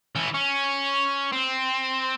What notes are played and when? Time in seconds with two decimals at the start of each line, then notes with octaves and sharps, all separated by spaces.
0.16 E3 C#4
0.34 C#4
1.32 C4